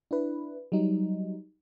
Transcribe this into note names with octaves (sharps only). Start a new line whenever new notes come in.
D4 E4 B4
F#3 G3 D#4